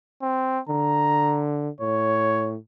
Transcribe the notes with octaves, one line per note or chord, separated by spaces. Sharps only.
C4
D3 A#5
A2 C#5